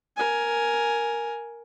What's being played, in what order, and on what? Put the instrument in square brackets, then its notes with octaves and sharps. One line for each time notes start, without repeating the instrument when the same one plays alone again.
[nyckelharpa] A#4 G#5